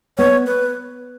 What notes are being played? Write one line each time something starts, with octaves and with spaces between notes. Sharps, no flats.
B3 C#5
B4